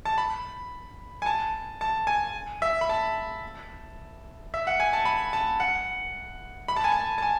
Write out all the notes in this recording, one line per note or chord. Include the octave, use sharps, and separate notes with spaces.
A5
B5
G#5
A5
A5
G#5
E5
B5
A5
E5
F#5
G#5
A5
B5
A5
F#5
B5
A5
G#5
A5
A5
G#5